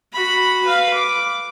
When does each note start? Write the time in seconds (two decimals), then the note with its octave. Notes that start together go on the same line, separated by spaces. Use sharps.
0.13 F#4 B5
0.65 B4 F5
0.94 D6